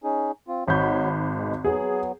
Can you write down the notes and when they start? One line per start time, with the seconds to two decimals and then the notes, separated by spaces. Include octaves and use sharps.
0.04 C#4 D#4 G#4
0.48 C4 F4
0.68 G#1 D#4 F#4 C#5 B5 G6
1.36 B2 G#3
1.64 F#3 B3 G#4